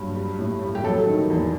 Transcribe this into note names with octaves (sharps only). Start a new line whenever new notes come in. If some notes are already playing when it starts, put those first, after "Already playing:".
Already playing: G2 F#3
G3
A2
G3
G4
F#3 A4
D#3
E2